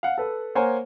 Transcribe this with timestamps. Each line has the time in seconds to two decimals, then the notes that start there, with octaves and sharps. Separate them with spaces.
0.03 F5 F#5
0.18 A4 B4
0.55 A#3 A#4 C5 C#5 F#5 G#5